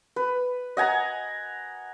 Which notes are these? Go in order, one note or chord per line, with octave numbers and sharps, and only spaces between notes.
B4
D#5 F#5 G#5 A#5